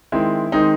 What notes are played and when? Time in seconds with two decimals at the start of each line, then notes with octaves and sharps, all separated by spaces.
0.12 D#3 G#3 C4 E4
0.52 D#3 G#3 C4 D#4